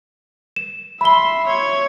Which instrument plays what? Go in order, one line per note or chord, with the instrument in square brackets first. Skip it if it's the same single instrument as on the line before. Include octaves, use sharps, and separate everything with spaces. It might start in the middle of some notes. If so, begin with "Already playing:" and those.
[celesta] E7
[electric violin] E5 C6 [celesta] B5 G7
[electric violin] C#5 G#6